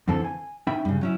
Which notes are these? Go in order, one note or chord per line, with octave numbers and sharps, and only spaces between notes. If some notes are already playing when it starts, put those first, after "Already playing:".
F2 D3 E3 C4 A4
G#5
C#4 D#4 E5 G5 B5
G2 C#3
F#3 C#4 E4